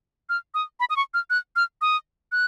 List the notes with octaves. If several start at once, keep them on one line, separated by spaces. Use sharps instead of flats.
F6
D#6
B5
D#6
C#6
F6
F#6
F6
D#6
F#6